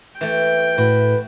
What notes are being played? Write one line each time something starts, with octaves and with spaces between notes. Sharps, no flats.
E3 A3 G5
A2 F#4 B4